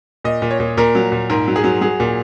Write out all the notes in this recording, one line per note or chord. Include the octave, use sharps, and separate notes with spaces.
A#2 D#5
A#2
C#5
A#2
A#2 A#4
F#3
A#2
G#2 A#4
F#3
G#4
F#3
F#3 G#4
A#2